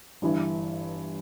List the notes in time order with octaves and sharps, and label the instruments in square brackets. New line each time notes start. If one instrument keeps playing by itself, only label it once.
[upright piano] G1 G2 E3